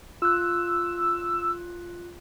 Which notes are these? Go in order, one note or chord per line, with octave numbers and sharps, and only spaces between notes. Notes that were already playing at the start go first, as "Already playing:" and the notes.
F4 E6 F#6